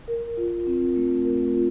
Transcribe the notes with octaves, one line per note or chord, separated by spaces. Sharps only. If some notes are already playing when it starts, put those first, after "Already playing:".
A#4
F4
C4
A3
A#4
F4